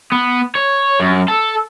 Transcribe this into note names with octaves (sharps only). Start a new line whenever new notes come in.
B3
C#5
F#2
A4